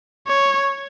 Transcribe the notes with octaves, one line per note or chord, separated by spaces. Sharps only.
C#5